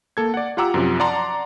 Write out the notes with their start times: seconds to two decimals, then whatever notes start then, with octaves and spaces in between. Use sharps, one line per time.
0.17 A#3 A4 G#6
0.34 D5 F#5
0.57 F4 G4 F#5 A#5 D6 E6
0.74 F#2 C3 F3
1.00 D5 F#5 A5 A#5 C6 D6